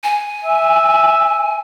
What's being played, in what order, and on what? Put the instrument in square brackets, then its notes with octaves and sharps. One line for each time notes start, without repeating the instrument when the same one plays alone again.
[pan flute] G#5
[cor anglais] E5